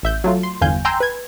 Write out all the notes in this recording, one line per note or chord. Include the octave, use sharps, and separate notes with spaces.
A1 E5 G6
F#3 A3 F4
C6
G1 E2 F5 G#5 G6
G5 G#5 A#5 C6 E6 G6
B4 G#6